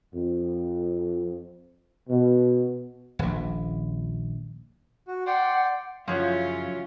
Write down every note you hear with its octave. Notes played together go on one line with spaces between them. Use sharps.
F2
B2
D#1 A#1
F#4
D5 F#5 G5 C6
F#2 C#3 F3 F#3 C#4 E4 F4 C#5